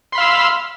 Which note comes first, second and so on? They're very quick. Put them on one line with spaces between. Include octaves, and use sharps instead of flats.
C6 B5 F5 E6